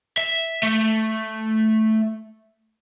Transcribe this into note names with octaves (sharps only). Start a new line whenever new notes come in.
E5
A3